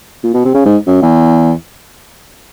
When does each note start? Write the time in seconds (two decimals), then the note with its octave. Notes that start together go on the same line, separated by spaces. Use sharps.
0.23 A#2
0.34 B2
0.45 C3
0.54 C#3
0.66 G#2
0.87 F#2
1.02 E2